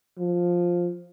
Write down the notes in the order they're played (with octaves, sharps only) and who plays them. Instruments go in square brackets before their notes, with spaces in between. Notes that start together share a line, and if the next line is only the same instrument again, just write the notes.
[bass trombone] F3